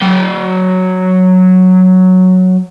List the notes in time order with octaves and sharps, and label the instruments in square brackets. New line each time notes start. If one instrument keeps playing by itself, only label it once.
[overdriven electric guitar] F#3 G5